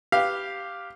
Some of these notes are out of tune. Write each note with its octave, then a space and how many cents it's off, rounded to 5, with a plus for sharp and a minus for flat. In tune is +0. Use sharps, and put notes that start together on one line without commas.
G4 +0 B4 +0 F5 +0